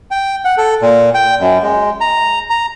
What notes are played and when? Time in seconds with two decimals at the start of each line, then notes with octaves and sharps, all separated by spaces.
0.11 G5
0.45 F#5
0.58 A4
0.82 A#2
1.14 G5
1.40 F#2
1.63 G#3
2.01 A#5
2.50 A#5